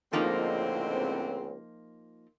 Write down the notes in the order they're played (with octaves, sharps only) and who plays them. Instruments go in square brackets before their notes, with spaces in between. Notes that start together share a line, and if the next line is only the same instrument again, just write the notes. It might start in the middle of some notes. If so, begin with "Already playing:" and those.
[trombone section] C#2 [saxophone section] A2 D3 C4 [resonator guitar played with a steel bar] F3 A#3 D#4